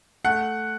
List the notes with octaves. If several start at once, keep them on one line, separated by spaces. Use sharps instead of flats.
A3 F#5